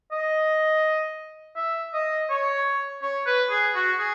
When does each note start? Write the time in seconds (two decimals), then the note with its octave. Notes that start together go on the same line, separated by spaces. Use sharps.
0.12 D#5
1.56 E5
1.94 D#5
2.30 C#5
3.02 C#5
3.26 B4
3.51 G#4
3.75 F#4
3.99 G#4